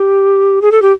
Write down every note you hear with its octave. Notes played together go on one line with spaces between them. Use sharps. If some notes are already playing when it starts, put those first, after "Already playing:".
Already playing: G4
G#4
A4
G4